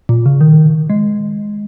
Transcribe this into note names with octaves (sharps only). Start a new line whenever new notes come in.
A#2
C#3
D#3
G#3